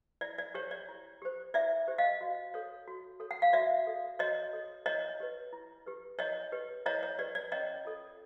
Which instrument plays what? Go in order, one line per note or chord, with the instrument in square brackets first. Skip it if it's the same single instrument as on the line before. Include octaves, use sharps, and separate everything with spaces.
[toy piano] E4 D5
D5
G4 C5 C#5
D5
E4
G4 C5
E4 D5 E5
G4 C5
D#5 F5
F#4
A4 C#5
F#4
A4 C#5
F#5
F5
F#4 D5 E5
A4 C#5
F#4 C#5 D#5
A4 C#5
E4 C#5 D#5
G4 B4
E4
G4 B4
E4 C#5 D#5
G4 B4
E4 C#5 D#5
C#5
G4 B4 D5
D5
C#4 C#5 D#5
F4 A4